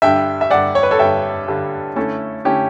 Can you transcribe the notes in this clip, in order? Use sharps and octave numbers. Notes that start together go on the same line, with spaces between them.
G2 D3 G3 E5 G5
E5
G2 D3 G3 D5 F#5
C#5
B4
A4 C#5
G2 D3 G3 E5 G5
G2 D3 G3
D3 A3 C#4 E4 A4
D3 A3 C#4 E4 G4